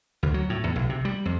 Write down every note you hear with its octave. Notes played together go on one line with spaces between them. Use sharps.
D2
F#3
A2
E2
B1
C3
G3
F2